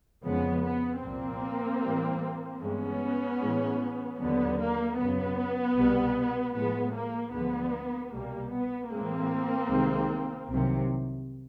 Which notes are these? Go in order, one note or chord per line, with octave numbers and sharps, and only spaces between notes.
F2 C#3 F3 G#3 B3
B3
C2 A#2 F3 A#3 C4
A2 E3 G3
G2 E3 G#3 B3 C#4
A2 E3 G#3
D#2 D3 F#3 B3
A#3
F#2 C#3 F#3 B3
C2 B2 G3
A2 F3 G#3 B3
A#3
D2 D3 F3 G#3 B3
C2 B2 G3 A#3
B3
A2 E3 G#3 A#3 C4
C2 C3 D#3 G#3
C2 C3 D#3 F#3